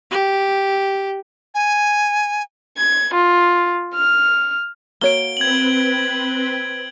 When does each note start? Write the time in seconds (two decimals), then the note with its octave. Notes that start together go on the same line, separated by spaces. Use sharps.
0.11 G4
1.55 G#5
2.78 G#6
3.14 F4
3.95 F6
5.01 A#3 F#4 C#5 D7 G7
5.37 C4 B4 G#6 F#7